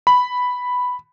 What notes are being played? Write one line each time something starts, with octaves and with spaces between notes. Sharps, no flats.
B5